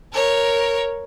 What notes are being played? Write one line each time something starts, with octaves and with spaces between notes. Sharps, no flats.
A#4 C#5